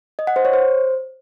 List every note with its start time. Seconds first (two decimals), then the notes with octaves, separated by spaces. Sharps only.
0.19 D#5
0.27 F#5
0.36 C5
0.45 C#5
0.53 C5